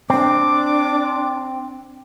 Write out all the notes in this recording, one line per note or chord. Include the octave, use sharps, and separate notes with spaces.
C4 D4 D6